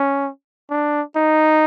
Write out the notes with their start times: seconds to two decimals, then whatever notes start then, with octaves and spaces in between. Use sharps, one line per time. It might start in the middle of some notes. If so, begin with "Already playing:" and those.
Already playing: C#4
0.70 D4
1.16 D#4